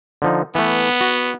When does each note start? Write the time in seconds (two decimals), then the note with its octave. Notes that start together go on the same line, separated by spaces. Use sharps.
0.22 D3 F3 D#4
0.55 E3 A3 B3
1.01 F#4